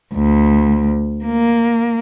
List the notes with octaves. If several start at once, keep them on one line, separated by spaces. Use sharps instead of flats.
D2
A#3